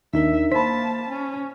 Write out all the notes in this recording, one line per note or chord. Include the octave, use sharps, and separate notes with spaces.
D#2 D4 D#4 A#4 E5
A#3 C5 A5 B5 B6
C#4